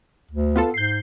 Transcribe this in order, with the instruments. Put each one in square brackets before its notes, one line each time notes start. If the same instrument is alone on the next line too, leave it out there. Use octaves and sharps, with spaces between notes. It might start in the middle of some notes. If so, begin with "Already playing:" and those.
[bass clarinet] D2
[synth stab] B3 F4 A4
[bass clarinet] G#2 [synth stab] G6 C7